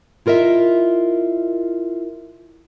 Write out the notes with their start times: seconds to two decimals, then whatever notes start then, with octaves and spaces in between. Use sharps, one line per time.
0.26 E4 F4 A#4 D#5 E5